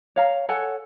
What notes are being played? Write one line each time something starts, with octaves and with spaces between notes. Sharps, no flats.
C#5 F5 A#5
A4 C#5 F#5 G#5